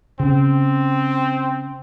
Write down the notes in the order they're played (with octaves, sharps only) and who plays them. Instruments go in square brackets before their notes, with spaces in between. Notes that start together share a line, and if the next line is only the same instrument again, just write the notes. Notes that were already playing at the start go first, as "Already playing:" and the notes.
[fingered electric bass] C#3 [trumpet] C4